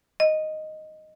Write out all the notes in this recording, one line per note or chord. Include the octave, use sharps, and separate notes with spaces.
D#5